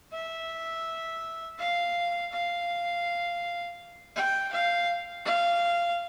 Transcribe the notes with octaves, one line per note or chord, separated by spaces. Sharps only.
E5
F5
F5
G5
F5
F5